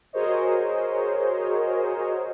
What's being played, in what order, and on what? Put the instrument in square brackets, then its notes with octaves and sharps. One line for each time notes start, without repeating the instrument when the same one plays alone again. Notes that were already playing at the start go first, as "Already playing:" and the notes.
[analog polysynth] F#4 G#4 A#4 C5 C#5 D#5